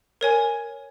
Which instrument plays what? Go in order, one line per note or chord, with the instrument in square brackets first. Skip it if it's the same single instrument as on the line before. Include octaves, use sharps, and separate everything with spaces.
[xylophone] A#4 C#5 G#5